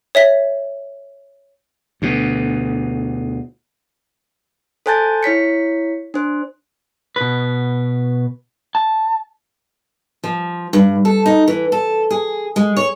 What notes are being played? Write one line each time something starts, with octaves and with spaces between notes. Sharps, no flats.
C#5 E5 B6
D2 B2
A4 C5 G#5 A5 G6 A6
E4 C#5 B6 C#7
D4 C5
B2 B4
A5
F3
G2
A4
D#4
E3
A4
G#4
G#3
C#5